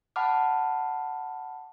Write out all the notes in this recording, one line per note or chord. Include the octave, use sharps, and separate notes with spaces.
F#5 A5 B5 D6 F6